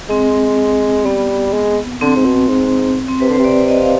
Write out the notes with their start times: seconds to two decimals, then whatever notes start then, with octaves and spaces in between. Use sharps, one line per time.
0.10 G#3 C4
1.05 G3 B3
1.53 G#3
2.01 D3 C4
2.16 G#2
2.25 B2
2.49 G#2
3.08 C4
3.20 C3 B4
3.30 D3 C5
3.39 C3
3.45 D5
3.68 D#5
3.80 F5